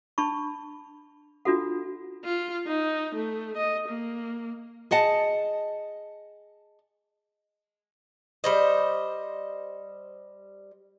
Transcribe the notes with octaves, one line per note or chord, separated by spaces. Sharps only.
D4 A5 B5 C#6
D4 F4 F#4 A4 F#5
F4
D#4
A3
D#5
A#3
G#4 D#5 F#5 A5
G3 C5 D#5